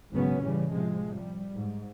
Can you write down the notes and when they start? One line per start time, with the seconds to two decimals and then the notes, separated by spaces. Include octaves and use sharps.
0.12 G#1 C#3 F#3 B3 C#4
0.41 A2 C#3 E3 G3
0.72 C3 F3 G#3
1.18 G3
1.56 G#2